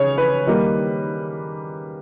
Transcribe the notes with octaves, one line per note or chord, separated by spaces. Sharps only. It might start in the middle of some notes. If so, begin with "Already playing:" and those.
Already playing: C#3 C#5
B4
D#3 G3 A#3